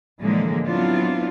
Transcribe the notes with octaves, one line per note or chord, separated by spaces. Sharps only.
A2 D3 E3 F3 G#3 A#3
F#3 B3 C4 D4 E4 F4